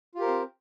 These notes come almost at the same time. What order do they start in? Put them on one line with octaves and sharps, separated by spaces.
F4 G4 A#4 C5 C4